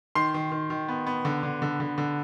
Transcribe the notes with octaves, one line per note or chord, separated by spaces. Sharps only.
D#3 C6 C7
D#3
D#3
D#3
B3
B3
D3
D3
D3
D3
D3